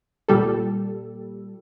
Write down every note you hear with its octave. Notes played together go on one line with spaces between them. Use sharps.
A#2 G3 A4